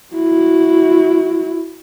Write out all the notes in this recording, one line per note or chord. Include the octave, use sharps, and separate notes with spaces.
E4 F#4